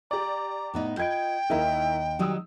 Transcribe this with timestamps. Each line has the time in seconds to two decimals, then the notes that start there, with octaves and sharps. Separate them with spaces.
0.11 G4 D5 A#5
0.74 A2 B3 D#4
0.97 F4 B4 D#5 G5 G6 G#6 D7
1.50 D#2 D#3 A#3 E4 A#4 D#5
2.19 D#3 F#3 G3 D#4 D#6 E6